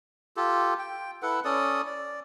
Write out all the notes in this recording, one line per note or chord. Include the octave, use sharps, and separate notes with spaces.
F4 G4 A4
G5
E4 A4 B4 F#5
C#4 A4 D5 D#6
D5